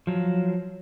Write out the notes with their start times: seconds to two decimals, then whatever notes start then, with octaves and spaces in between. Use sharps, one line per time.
0.07 F3 F#3